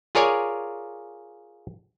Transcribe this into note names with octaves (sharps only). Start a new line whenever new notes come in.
F4 G#4 A#4 C#5 D5 G#5